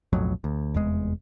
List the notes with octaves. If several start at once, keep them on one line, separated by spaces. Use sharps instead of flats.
B1 F2 A2 F#3
D2
F1 E2 G#3